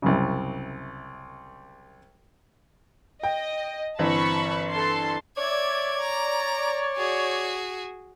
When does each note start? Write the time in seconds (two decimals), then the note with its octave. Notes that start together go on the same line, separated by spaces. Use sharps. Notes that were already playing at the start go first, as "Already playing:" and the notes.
0.02 C2 F#2 C#3
3.23 D#5 G5
3.99 G1 E3 C4 A5 B5 C#6
4.71 A4 A5 C6
5.37 C#5 D5 E5 G#6
6.00 A#5
6.97 F#4 G#4